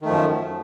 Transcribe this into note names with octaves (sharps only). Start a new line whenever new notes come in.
F#2 D#3 F3 A3